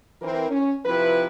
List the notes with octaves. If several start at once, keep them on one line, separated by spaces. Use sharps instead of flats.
E3 C4 A#4
C#4
C3 F3 C4 E4 B4